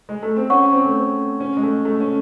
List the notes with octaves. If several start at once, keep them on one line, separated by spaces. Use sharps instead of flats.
G#3
A3
C4
C#4 C#5 F#5 C#6
C4
A3
C4
C#4
G#3
A3
A3
C#4